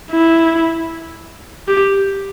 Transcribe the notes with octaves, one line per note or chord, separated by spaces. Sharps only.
E4
G4